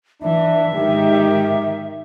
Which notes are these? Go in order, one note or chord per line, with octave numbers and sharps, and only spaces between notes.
E3 D4 E5
G#2 D#3 G4